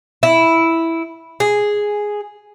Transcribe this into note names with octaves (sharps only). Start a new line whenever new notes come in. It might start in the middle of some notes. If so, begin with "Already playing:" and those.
E4
G#4